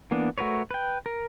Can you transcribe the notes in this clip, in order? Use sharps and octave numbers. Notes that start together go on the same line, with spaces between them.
E3 A#3 B3 D4
A3 F#4 A#4 B4 C#5
B4 G5
A#4